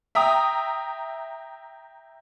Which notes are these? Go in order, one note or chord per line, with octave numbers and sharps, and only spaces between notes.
E5 G5 A#5 D#6